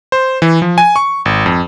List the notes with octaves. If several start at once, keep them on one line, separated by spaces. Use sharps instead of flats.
C5
E3
F3
G#5
C#6
G#1
F2